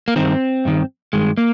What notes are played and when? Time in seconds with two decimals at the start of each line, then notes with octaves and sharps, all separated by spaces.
0.08 A#3
0.16 G2 D#3 C4
0.65 G2 D#3
1.13 G2 D#3 G#3
1.38 A#3